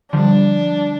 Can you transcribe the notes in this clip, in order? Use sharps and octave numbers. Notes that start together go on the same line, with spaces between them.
D3 F3 G3 D4